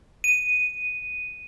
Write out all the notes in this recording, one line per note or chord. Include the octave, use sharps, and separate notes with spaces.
D#7